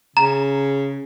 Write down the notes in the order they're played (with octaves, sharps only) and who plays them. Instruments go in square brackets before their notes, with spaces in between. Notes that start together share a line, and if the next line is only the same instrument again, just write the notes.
[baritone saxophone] C#3 [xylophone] A#5